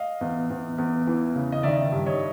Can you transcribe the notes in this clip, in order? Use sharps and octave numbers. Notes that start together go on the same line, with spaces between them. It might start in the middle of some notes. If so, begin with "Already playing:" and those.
Already playing: D#5 F5
E2
E2
E2
E3
C#3
D#5
D#3 D5 E5
G2
C#5 D#5